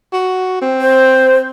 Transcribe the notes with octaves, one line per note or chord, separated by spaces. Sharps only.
F#4
C4
C5